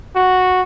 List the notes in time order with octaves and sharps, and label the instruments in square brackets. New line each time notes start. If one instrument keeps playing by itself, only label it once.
[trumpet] F#4